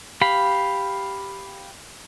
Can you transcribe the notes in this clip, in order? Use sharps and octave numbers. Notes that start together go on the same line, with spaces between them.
G4 F5 B5